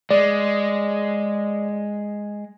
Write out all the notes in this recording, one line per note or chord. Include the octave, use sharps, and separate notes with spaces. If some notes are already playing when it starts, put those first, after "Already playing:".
G#3 D5